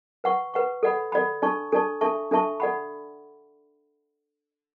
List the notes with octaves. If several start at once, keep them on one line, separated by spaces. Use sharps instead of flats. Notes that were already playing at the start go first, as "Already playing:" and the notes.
B4 F#5 C#6
B4 F#5 C#6
A4 D5 F#5 B5
A4 D5 F#5 B5
D4 A4 D5 A5 C#6
D4 A4 D5 A5 C#6
D4 A4 E5 A5 C#6
D4 A4 E5 A5 C#6
A4 D5 F#5 B5